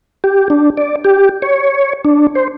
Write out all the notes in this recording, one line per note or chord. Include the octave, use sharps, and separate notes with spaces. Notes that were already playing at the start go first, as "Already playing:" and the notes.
G4
D4
D5
G4
C#5
D4
C5